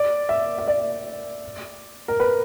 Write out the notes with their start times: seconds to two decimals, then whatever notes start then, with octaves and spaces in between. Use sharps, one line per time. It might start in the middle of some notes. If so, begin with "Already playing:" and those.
Already playing: D5
0.29 E5
0.58 E5
0.68 D5
2.08 A#4
2.20 B4